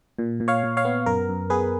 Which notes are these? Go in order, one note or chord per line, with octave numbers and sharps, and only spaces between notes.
A#2
A#2
C#5 F5
A#2
C#5 F5
B3
F#2 A#4
F#2
B3 G#4 B4